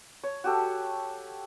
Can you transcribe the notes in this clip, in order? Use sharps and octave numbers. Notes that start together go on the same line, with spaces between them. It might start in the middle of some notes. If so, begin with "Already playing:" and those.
C#5
F#4 G4 A4